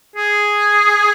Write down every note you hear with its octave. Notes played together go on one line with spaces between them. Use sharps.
G#4